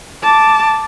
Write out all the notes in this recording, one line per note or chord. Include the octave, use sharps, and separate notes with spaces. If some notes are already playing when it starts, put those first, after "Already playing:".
A5 D6